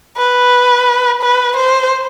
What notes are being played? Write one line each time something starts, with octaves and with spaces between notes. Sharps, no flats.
B4
B4
C5